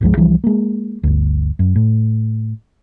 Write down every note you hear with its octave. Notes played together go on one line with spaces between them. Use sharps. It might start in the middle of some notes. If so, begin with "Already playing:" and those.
G1 C#2 F3 G#3
C2 E3 F3 G3
G#3 A#3
G1 D2
F#2
A2